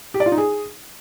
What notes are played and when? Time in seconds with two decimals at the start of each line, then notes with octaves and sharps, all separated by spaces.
0.14 G4
0.20 D5
0.26 F4
0.32 D#4
0.38 G#4